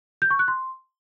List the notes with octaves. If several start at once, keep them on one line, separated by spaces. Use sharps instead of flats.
G6
C#6
F#6
C6